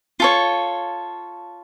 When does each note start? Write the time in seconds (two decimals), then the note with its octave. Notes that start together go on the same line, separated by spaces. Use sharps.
0.20 F4 A4 C#5